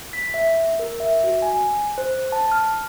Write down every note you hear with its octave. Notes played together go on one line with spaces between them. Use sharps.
B6
E5
A#4
E5
F#4
G#5
C5
A5
F6